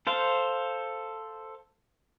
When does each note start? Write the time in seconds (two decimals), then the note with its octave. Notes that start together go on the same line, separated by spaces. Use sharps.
0.07 A4 C5 F5